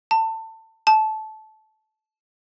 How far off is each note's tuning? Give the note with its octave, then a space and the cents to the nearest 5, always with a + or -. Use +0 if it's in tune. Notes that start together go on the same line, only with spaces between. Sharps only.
A5 +25
A5 -20